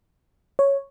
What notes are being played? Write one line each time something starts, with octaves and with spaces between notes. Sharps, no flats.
C#5